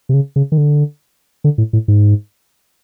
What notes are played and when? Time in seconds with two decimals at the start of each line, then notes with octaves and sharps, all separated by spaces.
0.09 C3
0.14 C#3
0.36 C#3
0.52 D#3
0.58 D3
1.44 D3
1.58 A2
1.73 A2
1.88 G#2